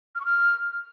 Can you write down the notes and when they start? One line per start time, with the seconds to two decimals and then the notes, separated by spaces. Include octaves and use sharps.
0.15 F6
0.20 C#6
0.25 F6